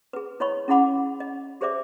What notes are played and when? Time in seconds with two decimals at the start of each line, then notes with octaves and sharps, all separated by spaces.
0.13 G#4 B4
0.40 E4 C#5 D#5 B5 C#6
0.68 C#4 E4 G#4 F#5 B5 D6
1.20 D#5
1.61 G4 G#4 C5 D5 E5 D6